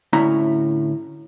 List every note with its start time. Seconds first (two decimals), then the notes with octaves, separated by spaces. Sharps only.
0.13 D2 A2 C#4 E4 A#5